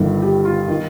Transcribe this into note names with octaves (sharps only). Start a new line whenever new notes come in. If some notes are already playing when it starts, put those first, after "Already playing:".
Already playing: G1 G2 D#3 A4
G4
F4
D#3